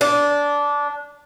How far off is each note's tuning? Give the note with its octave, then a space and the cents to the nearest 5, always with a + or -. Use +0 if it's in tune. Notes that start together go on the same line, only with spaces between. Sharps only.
D4 -15